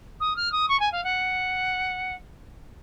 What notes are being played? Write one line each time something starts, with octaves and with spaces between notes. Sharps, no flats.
D#6
F6
D#6
C#6
G#5
F5
F#5